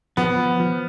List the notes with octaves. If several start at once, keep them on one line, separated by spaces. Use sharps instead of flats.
F3 B3
F3
F3